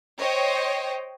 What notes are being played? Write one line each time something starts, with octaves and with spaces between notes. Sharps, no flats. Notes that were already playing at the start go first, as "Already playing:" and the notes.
C5 C#5 D#5 G5